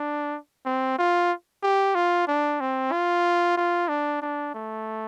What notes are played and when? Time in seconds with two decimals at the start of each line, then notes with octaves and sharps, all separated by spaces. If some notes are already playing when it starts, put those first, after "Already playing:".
Already playing: D4
0.65 C4
0.98 F4
1.63 G4
1.95 F4
2.27 D4
2.60 C4
2.92 F4
3.57 F4
3.88 D4
4.22 D4
4.54 A3